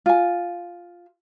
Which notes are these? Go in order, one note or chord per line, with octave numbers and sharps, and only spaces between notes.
F4 G#5